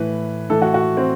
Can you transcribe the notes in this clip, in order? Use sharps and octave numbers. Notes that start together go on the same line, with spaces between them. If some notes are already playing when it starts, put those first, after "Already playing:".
Already playing: A2 E3 B4
A2 E3 A4
F#4
F#4
C4